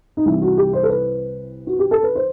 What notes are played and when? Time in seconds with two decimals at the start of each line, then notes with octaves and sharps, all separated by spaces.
0.17 D#4
0.25 C2 C3 E3 E4
0.42 F#4
0.58 G4
0.73 C5
0.83 A4
0.89 B4
1.67 F#4
1.79 G4
1.91 A4
2.03 B4
2.15 C5